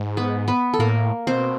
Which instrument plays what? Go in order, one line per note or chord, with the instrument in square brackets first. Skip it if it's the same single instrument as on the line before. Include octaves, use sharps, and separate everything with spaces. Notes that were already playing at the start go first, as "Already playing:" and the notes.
Already playing: [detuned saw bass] G#2
[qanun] B3 B4
B3 B4
A4
[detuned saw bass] A2 [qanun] A#3 A#4
[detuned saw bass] B2 [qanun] C4 C5